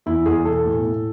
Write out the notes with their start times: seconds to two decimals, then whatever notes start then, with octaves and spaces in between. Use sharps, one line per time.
0.06 E2 E4
0.26 E2 G#4
0.45 B2 A4
0.65 A2
0.85 A2